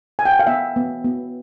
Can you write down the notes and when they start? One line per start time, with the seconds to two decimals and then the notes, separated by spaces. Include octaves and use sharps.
0.19 G#5
0.25 G5
0.32 F#5
0.39 F5
0.47 B3 E5
0.76 B3
1.04 B3